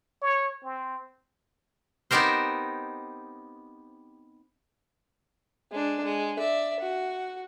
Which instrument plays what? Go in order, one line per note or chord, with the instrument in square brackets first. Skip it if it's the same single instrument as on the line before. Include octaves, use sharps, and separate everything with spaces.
[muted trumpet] C#5
C4
[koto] B3 C4 D#4 G4 A#4 C5
[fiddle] G#3 D4
G#3
D5 E5
F#4